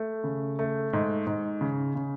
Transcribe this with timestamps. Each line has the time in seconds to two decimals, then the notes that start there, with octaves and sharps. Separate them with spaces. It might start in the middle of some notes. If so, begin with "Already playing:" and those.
Already playing: A3
0.24 C#3
0.59 A3
0.93 G#2
1.27 G#2
1.61 C#3
1.95 C#3